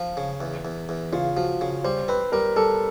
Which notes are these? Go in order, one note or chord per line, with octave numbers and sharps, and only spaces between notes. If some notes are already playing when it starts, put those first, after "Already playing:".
Already playing: F3
C#3
E2
E2
E2
C#3 F4
F3 F#4
C#3
G3 C5
C4 B4
G3 A#4
G3 A4